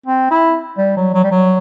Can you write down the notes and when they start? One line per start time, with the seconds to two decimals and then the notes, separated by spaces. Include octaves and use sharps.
0.06 C4
0.31 E4
0.78 G3
0.97 F#3
1.14 F#3
1.24 G3
1.31 F#3